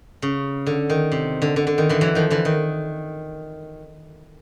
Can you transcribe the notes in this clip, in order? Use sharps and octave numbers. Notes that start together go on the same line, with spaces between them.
C#3
D3
D#3
C3
D3
D3
D3
D#3
D3 E3
E3 F#3
D#3 F3
D3 E3
D#3